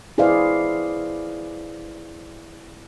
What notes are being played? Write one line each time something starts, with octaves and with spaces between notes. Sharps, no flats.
E4 G#4 B4 C5 D5 F5